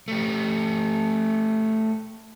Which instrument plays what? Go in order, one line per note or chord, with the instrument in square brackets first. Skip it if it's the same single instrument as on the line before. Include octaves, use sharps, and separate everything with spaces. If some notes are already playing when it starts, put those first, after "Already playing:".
[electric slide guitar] A3 G4